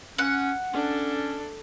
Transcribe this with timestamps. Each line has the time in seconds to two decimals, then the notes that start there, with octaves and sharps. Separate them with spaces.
0.18 C#4 F#5
0.73 C#4 D4 A4